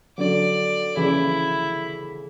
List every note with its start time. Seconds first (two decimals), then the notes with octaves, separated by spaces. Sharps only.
0.18 D3 F#3 D5
0.97 C#3 E3 E4